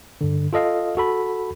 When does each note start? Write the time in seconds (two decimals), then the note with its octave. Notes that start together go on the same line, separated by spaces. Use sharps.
0.21 G2 D3
0.53 F4 A4 D#5 F5
0.97 F#4 A4 B5